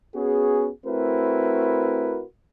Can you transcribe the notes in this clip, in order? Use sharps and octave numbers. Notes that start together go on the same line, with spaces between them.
B3 C#4 F#4 G#4
A3 C4 E4 F#4 A#4 B4